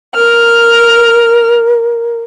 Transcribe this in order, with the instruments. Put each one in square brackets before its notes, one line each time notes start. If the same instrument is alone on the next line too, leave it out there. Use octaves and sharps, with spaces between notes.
[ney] A#4 [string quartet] F6